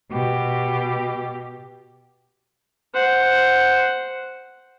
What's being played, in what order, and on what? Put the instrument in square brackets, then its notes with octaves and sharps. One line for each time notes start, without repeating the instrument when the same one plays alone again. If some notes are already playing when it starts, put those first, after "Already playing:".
[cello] B2 G4
[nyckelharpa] C5 F#5